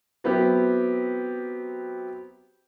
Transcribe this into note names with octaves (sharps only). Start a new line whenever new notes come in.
F#3 B3 C4 E4 G4